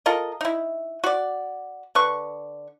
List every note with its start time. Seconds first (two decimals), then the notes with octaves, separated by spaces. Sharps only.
0.06 F4 A4 A#4 D#5
0.41 D#4 E4
1.04 F#4 D5
1.95 D3 B4 C#6